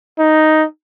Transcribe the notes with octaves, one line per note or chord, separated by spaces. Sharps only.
D#4